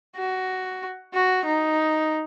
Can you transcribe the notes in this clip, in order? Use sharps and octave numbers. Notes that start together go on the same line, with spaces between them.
F#4
F#4
D#4